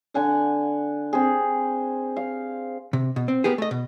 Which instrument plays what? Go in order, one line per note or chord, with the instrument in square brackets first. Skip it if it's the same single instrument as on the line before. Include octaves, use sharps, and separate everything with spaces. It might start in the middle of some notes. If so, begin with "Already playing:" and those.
[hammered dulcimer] D3 F#5 G#5 D6
C4 G#4
F5
[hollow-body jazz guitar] C3
B2
C4
A#3 B3 G4 G#4
A3 D#5
B2